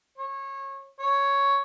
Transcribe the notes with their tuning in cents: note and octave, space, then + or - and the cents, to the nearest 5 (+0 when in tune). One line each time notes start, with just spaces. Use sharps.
C#5 -25
C#5 +5